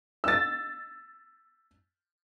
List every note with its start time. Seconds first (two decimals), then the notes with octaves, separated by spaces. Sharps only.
0.24 E6 A6